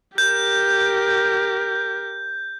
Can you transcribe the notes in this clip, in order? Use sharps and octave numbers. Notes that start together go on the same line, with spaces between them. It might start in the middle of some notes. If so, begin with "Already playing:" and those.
G4 A#4 G6